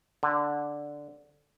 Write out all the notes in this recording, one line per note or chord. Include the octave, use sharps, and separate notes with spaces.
D3